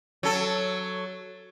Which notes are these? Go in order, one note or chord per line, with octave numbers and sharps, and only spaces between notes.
F#3 A4